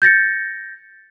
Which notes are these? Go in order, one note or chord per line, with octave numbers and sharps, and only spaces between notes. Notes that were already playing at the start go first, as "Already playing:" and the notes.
G6 A6 A#6 C#7